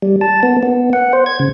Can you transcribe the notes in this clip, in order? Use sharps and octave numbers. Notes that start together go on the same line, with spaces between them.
G3
A5
B3
B3
F#5
C5
G#6
C#3